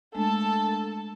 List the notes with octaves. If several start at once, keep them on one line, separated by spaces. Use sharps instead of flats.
G#3 A3 D4 A4 A5